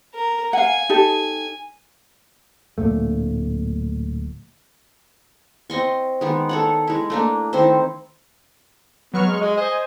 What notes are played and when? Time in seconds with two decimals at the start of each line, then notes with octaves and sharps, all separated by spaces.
0.14 A#4
0.53 F5 F#5 G#5
0.89 D#4 G4 A4
2.78 D1 C2 A#2 A3
5.70 C4 D#5 C6 C#6
6.21 D#3 G#3 B3
6.49 A4 C#5 F#5
6.88 G#3 E4
7.10 A3 A#3 D4
7.53 D#3 C4 E4 C5
9.14 F#3 B3 C#6 F6
9.26 G#3
9.42 G#3 D#5
9.57 C5 D#5 G#5